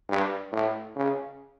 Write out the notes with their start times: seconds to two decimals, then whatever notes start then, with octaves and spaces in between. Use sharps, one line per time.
0.09 G2
0.53 A2
0.96 C#3